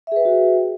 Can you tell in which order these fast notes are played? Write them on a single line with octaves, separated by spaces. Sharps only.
E5 G#4 B4 G5 F#4